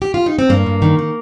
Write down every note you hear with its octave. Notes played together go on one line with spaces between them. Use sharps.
G4
F4
D#4
C4
G2 A#3
G2
D#3
D#3